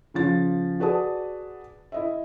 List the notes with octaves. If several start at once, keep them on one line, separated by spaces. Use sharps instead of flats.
C#3 F3 A6
F#4 G#4 B4 D5 A5 D#6
E4 D#5 E5